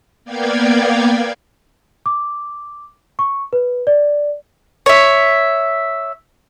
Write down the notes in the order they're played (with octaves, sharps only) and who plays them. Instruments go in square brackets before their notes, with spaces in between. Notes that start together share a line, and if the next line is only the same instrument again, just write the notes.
[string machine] A#3 B3 D5 F5 G5 G#6
[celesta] D6
C#6
B4
D5
[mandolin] C#5 E5